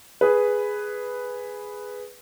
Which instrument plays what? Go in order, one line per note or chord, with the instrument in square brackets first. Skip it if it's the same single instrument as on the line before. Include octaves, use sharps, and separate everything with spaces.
[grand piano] G#4 B4